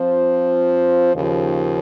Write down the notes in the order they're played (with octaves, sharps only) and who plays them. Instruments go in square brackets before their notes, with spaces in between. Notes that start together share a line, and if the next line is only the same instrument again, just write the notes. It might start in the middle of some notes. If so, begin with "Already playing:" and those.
Already playing: [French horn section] F3 C4 F4 C5
D#2 C#3 F3